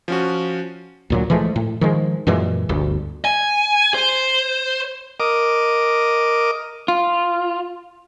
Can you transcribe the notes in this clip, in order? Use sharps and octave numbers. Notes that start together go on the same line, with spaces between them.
F3 C#4 F#4
D2 A#2 F#3
E3 F3 G#3 A3
A2
D#3 F3 G#3
F#2 A#2 E3 G#3
G1 D2
G#5
C5
A#4 D#5 D6
F4